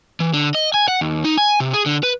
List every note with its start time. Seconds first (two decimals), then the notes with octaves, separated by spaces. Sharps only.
0.20 E3
0.34 D3
0.55 D#5
0.74 G#5
0.88 F#5
1.01 D#2
1.24 D#4
1.37 G#5
1.60 C3
1.73 G#4
1.86 D3
2.03 B4